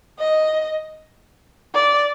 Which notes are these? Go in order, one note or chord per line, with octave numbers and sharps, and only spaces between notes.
D#5
D5